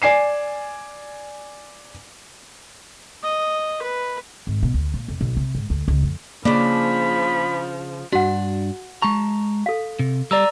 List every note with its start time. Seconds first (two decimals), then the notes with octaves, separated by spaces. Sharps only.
0.02 D5 G#5 C7 E7
3.23 D#5
3.82 B4
4.47 G#1
4.63 B2
4.74 D2
4.94 A#2
5.08 F1
5.21 B1
5.37 C3
5.55 G#2
5.70 D2
5.88 C#2
6.03 F2
6.45 C#3 F3 A#3 D4 B5
8.13 G2 D4 F#4 F#5
9.02 G#3 A5 A#5 C#6
9.66 A4 F5
9.99 C3
10.31 G3 D5 A#5 E6